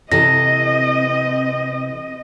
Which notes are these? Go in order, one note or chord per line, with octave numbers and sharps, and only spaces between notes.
C3 E3 C4 A4 D#5 A#6